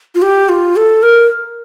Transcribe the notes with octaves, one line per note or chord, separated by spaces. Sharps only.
F4
G4
F4
A4
A#4